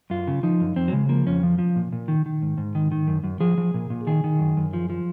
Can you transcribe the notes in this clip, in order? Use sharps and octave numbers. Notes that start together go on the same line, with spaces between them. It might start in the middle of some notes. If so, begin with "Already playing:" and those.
F#2 F4
C#3
F3 D#4
F#2
F2 C4
F#3
C#3 G#3
F3 A#3
F2 C#4
F3
F3
A#2
A#2
D#3
D#3
G#2
G#2
D#3
D#3
F#2
F#2
F3 G#4
F3
A#2
A#2
D#3 G#4
D#3
F#2
F#2
F3
F3